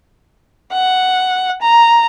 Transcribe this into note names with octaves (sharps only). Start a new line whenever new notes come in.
F#5
A#5